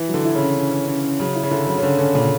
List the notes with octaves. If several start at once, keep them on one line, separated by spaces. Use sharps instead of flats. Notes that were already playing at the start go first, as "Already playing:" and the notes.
Already playing: E3
F#3
D3
E4
C#3
C#4
C#4
C#4
C#4
C#4
C#3 F#3
E4
C#3
D3 E4
C#3 F#3
C#3
D3 C#4
D3 C#4
A#2 C#3